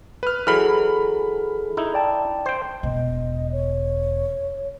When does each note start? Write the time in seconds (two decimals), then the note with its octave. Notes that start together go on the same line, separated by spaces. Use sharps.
0.23 B4 F6
0.47 E3 F#3 G#4 A4 B5 F6
1.77 D#4 E4
1.94 D5 G5 A5
2.46 C5 G5
2.83 E1 D#5
3.52 C#5